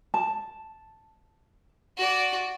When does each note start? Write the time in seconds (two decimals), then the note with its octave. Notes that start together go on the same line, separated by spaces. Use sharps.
0.14 A5
1.98 F#4 D5